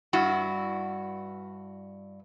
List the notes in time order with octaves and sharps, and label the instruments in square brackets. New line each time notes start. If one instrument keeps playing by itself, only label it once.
[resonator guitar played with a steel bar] G2 E4 F#4